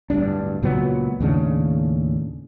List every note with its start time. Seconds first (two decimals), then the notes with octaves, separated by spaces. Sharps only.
0.10 D1 G1 G2 D4
0.62 C#2 A#2 F#3 B3
1.20 D#2 A2 C#3 D4